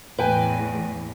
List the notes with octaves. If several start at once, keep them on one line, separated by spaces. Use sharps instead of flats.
E2 A2 E3 B4 G5 G#5